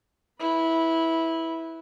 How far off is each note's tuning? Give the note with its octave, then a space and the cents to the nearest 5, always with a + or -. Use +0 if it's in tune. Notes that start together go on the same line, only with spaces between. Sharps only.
E4 -15 B4 +0